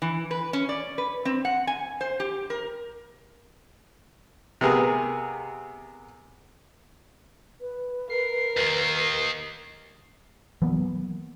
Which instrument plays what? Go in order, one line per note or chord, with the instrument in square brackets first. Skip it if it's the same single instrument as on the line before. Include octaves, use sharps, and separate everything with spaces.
[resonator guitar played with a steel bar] E3
B4
C#4
D5
B4
C4
F#5
G#5
C5
G4
A#4
[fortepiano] C3 B3 G#4 A#4
[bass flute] B4
[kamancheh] A#4 [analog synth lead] C7
[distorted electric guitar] D#2 D#3
[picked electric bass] E3 F#3 A#3 B3